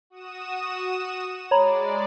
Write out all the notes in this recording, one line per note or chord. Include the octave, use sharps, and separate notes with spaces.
F#4 D#6 E7
G#3 C#5 D5 A#5 B5